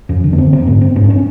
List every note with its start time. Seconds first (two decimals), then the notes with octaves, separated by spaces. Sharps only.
0.09 F2 C#4
0.24 D3
0.33 B3
0.38 F2 C4
0.52 D3 C4
0.67 G#2 B3
0.81 C4
0.96 G#2 C#4
1.04 D4
1.10 C#4